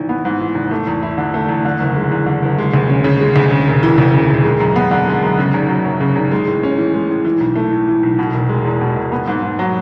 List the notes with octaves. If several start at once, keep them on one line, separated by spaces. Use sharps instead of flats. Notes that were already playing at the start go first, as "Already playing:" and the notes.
Already playing: G#1 E3
B3
G#2
E3
G#1
A3
E2
E4
D3
A3
E2
D3
F#1
G#3
E2
D3
F#1
G#3
D2
C#4
C#3
G#3
D2
C#3
E1
E3
D2
C#3
E1
G#3
F#2
B3
D3
G#3
F#2
C#3
G#1
F#3
F#2
C#3
G#1
G#3
A2
C#4
E3
G#3
A2
E3
B1
A3
A2
E3
B1
B2
E1
G#3
E2
B2
E1
B3
G#2
G#2
F#3